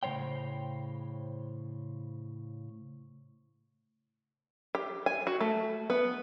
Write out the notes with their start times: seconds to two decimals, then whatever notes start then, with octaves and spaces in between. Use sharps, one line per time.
0.03 A2 C#3 E3 C5 C#5 G5
4.75 G4
5.06 G#5
5.27 F#4
5.41 A3
5.90 B3